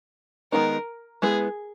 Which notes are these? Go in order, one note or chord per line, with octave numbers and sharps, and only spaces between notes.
D#3 G#3 B3 D#4 A#4
G#3 B3 E4 G#4 B4